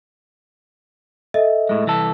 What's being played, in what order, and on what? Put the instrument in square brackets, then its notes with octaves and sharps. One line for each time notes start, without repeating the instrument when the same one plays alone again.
[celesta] A4 D#5 E5
[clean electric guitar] A2 G#3
C2 E3 A4